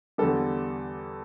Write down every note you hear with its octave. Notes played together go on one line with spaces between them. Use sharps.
E2 D3 G3 A4